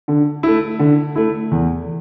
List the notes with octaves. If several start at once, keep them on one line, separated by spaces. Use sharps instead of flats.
D3
A3 E4
D3
A3 E4
E2